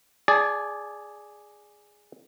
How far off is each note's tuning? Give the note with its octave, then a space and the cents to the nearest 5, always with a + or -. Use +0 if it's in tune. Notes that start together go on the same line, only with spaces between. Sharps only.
G#4 +0 D5 +0 A5 -35